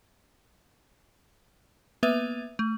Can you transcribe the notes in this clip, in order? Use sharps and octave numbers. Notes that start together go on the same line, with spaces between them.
A#3 B3 B4 E5 D#7 F7
A3